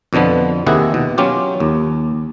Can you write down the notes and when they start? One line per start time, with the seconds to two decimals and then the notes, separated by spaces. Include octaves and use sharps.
0.13 F2 B2 D3 F3 B3
0.66 D#2 C3 D#3 E4 G#4 F#5
0.94 B2
1.18 F#3 C#4 F4 G4
1.60 D#2